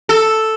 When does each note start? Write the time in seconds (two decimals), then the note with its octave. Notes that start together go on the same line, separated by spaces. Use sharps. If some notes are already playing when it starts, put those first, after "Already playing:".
0.09 A4